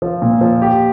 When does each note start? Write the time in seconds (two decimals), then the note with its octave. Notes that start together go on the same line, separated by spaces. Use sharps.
0.02 F3
0.22 A#2
0.41 F3
0.62 G4